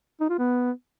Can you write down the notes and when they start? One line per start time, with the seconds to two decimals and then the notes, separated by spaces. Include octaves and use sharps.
0.21 D#4
0.30 F4
0.39 B3